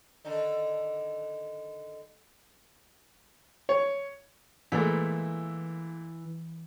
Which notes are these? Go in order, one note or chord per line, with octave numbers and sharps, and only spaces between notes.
D3 D#3 D#4
C#5
A#2 E3 G#3 A3